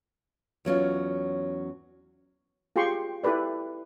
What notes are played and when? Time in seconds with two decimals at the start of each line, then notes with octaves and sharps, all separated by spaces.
0.65 E2 F#3 C#4 F4
2.76 F4 G4 G#4 G5 C6 C#6
3.24 E4 G4 A4 B4 D5